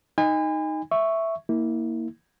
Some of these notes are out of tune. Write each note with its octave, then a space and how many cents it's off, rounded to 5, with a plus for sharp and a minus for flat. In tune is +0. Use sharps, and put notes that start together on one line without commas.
D#4 +0 G#5 -35 B5 +40
E5 +0 C#6 +0
A#3 +0 E4 -30